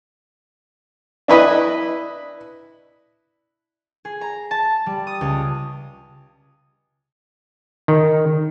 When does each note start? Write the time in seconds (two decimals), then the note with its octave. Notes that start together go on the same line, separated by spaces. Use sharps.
1.28 D4 E4 B4 D#5
4.05 G#4
4.21 A#5
4.51 A5
4.86 G3
5.07 D#6
5.21 C#2
7.88 D#3